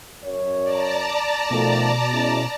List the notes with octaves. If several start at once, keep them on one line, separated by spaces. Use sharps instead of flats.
F#2 C#5
D5 A5 A#5
B2 D#3 F3 A3
G#3 C#4 E4